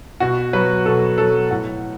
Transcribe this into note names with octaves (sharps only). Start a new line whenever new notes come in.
B2 F#4
F#3 B4
B2 A4
F#3 A4
A2 F#5